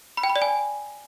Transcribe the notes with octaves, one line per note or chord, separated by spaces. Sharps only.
B5
G5
B5
D5
G#5